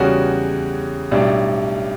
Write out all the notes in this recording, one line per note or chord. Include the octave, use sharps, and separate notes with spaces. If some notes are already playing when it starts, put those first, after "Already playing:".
Already playing: E2 C#3 G3 C#4 F#4
B1 A2 G3 D4